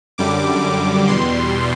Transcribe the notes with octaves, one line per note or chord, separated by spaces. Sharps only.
F#2 D3 G3 D6
E2 B2 G3 C6